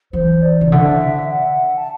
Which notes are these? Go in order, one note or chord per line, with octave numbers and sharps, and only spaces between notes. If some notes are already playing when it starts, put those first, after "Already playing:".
E3 C5
D5
C3
D3 E5
F#5
A5